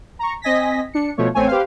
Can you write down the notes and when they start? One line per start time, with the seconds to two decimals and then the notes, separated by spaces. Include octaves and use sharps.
0.19 A#5 C#6
0.42 C4 D#5 G#5 A#6 B6
0.94 D4 C#7
1.17 B2 F3 A3 C#5
1.35 A1 A3 C4 C#5 G#5
1.47 G4 B4 C5 F5